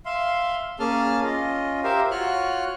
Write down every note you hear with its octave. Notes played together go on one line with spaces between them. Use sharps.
E5 F5 C6
A#3 C#4 G#4 A5 F6
C#4 F4 D#5
G4 A#4 C5 E5 F5
F4 F#4 C#5 F6 F#6